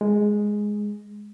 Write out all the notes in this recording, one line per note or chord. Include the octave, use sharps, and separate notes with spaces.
G#3